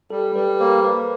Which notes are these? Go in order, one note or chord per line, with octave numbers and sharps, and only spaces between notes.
G3 A4
G3 B4
A#3 C5
A#3 B4